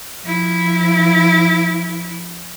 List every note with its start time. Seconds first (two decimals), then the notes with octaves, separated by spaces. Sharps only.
0.22 F3 E4